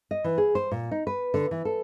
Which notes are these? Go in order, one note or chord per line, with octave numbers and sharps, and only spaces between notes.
D#5
E3
G#4
C5
A#2
D#4
B4
D3
E3
A4